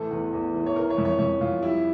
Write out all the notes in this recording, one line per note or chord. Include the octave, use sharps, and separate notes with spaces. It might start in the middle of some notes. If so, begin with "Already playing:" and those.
Already playing: A1 E3 A4
E2
E2
E3
C#5
E3 A#4
C#5
F2
C#5
F2 C#5
F2 F4
G3 E4